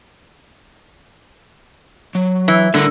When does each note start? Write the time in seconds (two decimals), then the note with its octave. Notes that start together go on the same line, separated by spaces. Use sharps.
2.15 F#3
2.48 E3
2.74 A2 D3 G3 A#4